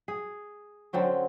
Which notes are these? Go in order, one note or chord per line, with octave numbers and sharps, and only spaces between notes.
G#4
D3 F#3 C4 C#4